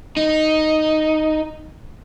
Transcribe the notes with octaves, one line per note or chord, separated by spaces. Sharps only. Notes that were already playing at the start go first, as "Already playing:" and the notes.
D#4